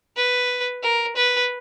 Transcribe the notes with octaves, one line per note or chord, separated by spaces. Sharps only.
B4
A#4
B4